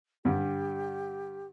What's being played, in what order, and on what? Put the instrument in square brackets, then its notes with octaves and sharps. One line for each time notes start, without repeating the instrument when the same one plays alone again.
[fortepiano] G2 D3 [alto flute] G4